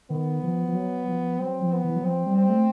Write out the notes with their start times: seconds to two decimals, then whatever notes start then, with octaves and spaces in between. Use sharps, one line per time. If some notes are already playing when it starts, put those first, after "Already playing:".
0.10 D#3 B3
0.43 F3
0.68 F3
0.75 F#3
1.08 F3
1.40 F#3 C4
1.61 F3
1.73 B3
1.84 E3
1.96 F#3
2.05 F3 C4
2.26 G3
2.38 C4
2.49 A3